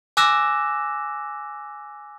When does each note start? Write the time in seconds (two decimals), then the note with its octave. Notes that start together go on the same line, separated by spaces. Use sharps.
0.17 G#5 D6 E6 F#6 A#6 E7